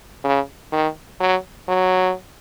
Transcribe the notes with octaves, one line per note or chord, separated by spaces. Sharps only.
C#3
D#3
F#3
F#3